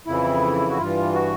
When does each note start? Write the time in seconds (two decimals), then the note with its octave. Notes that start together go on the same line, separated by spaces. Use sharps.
0.07 F2 C#3 E3 E4
0.70 F#4
0.79 G2 E3 F4
1.14 F#4